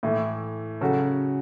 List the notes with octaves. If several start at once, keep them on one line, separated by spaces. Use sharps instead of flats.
A2 E3 A3
C#3 F#3 C#4 F#4 A4